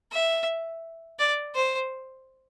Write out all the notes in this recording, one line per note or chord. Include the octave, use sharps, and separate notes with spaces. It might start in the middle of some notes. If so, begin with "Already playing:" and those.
E5
D5
C5